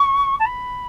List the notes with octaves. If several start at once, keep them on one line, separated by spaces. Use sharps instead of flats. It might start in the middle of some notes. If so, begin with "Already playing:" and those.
Already playing: C#6
A5
B5